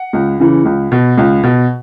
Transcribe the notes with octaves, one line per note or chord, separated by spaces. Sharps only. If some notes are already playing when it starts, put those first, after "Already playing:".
Already playing: F#5
C#2
C#3 E3
C#2
B2
C#2
B2